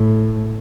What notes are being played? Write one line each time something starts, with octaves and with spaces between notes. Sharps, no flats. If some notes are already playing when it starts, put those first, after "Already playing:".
Already playing: A2